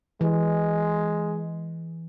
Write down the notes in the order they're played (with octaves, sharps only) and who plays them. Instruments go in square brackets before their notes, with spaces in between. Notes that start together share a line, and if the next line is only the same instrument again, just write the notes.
[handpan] E3 [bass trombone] G#3